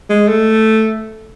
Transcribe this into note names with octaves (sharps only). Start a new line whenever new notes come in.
G#3
A3